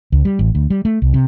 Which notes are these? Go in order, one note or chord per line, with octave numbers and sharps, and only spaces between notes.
C#2
G3
A1
D2
G3
A3
C2
C3